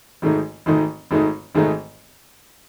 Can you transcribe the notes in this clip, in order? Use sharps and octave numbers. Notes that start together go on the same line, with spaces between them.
G#1 G#2 D#3 A3 D#4
G#1 G#2 D#3 A3 D#4
G#1 G#2 D#3 A3 D#4
G#1 G#2 D#3 A3 D#4